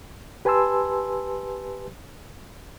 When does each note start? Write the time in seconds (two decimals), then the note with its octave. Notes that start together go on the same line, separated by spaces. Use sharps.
0.45 G4 B4 G#5 A5 C6 E6